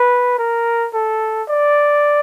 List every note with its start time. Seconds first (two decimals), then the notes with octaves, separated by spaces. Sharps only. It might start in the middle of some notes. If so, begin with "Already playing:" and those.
Already playing: B4
0.39 A#4
0.94 A4
1.49 D5